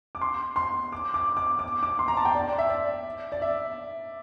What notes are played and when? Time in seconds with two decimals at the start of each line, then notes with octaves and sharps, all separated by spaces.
0.15 D6
0.21 C6
0.56 C6
0.92 D6
1.14 D6
1.37 D6
1.59 D6
1.83 D6
1.99 C6
2.08 A#5
2.17 A5
2.25 G5
2.35 D5
2.58 E5
2.69 D5
3.32 D5
3.42 E5